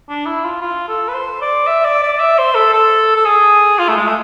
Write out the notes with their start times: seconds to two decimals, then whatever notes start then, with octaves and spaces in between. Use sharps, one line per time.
0.09 D4
0.26 E4
0.44 F4
0.62 F4
0.88 A4
1.09 B4
1.14 C5
1.41 D5
1.67 E5
1.85 D5
2.03 D5
2.13 D5
2.20 E5
2.38 C5
2.55 A4
2.72 A4
3.16 A4
3.25 G#4
3.79 F4
3.89 A3
3.96 G#3
4.07 A3